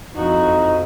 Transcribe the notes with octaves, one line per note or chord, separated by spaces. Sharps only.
F2 D#4 E4 F#4